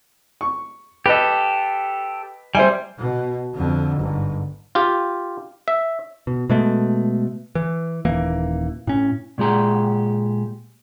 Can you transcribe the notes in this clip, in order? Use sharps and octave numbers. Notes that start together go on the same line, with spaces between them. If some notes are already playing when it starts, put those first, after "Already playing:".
C#6
G4 A4 B4 D#5
G3 C5 E5 G#5
B2
F2 D3
G1 G#2
F4 G4
E5
B2
B2 G#3 A3
E3
D#1 E3 A#3
A2 C#4
A#2 G#3 G4 A#5